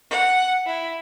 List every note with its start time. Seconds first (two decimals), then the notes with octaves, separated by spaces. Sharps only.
0.11 F#5
0.66 E4